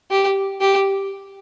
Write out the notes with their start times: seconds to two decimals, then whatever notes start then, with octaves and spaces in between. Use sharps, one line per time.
0.11 G4
0.61 G4